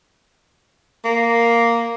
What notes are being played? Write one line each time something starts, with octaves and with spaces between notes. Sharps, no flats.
A#3